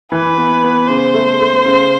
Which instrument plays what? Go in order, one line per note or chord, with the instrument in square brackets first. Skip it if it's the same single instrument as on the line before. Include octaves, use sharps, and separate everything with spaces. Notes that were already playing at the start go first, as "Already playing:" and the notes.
[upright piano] E3 [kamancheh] B4
[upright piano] B3
B3
[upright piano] C#3 [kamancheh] C5
[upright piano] A3
A3
C#3